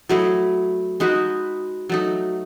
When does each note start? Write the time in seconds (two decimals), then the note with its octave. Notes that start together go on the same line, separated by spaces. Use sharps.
0.09 F#3 A3 E4 G#4
1.00 G#3 D#4 F#4 B4
1.89 F#3 A3 D#4